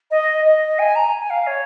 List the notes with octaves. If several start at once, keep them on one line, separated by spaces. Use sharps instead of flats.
D#5
D#5
G#5
A#5
G#5
F5
C#5